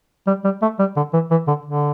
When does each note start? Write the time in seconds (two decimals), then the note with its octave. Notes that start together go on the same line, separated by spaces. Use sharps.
0.27 G3
0.44 G3
0.62 A3
0.79 G3
0.97 D3
1.13 E3
1.31 E3
1.48 D3
1.66 D3